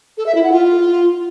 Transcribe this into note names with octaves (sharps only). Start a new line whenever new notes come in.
A4
E5
E4
F#5
F4